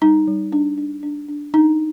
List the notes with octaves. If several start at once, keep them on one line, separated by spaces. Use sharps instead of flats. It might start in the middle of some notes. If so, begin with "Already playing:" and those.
G3 D#4
G3
D4
D4
D4
D4
D4 D#4